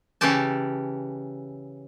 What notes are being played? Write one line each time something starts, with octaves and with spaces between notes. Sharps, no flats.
C#3 E3 C#4 G4 A5